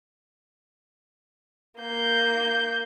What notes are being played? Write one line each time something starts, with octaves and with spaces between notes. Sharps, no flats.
A#3 G6